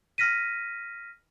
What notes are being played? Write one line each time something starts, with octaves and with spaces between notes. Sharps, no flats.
F6 A#6 B6 D#7